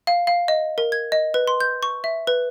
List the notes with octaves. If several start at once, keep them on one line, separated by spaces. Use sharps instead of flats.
F5
F5
D#5
A#4
G#6
D#5
B4
C6
G6
C#6
E5
B4